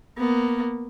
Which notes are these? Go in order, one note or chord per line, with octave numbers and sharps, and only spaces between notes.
A#3 B3